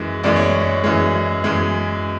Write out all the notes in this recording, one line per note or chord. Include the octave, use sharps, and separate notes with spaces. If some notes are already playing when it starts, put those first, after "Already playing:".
Already playing: F#2 E3 G#3
F#2 E3 G#3 D5
C#5
C#5
F#2 E3 G#3
F#2 E3 G#3